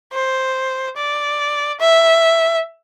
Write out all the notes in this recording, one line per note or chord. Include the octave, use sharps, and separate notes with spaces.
C5
D5
E5